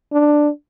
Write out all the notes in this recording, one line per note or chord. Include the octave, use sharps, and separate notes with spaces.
D4